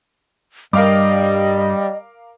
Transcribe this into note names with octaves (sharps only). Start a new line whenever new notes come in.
G2 G3 A#4 D#5 F5 D6